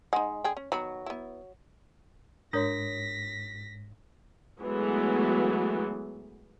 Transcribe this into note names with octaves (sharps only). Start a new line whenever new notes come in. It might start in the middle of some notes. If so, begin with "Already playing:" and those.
G#3 D#4 F#5
D3 G#4 G5
C#4
D#3 F#3 B3 B5
B3 E4
G#2 D4 F#4 A#4 C#5 D#6 A#6 B6
E3 F#3 G#3 A3 B3